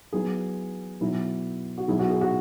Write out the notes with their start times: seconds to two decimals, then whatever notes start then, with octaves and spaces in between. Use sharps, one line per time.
0.13 F#3 B3 E4 G#4
1.01 B2 F#3 E4
1.78 F#4
1.88 B2 F#3 E4 G#4
1.99 F#4
2.10 G#4
2.21 F#4